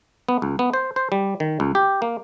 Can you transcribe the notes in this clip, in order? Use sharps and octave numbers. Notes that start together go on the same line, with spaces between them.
B3
C#2
B3
C5
C5
G3
D#3
C#2
G4
A#3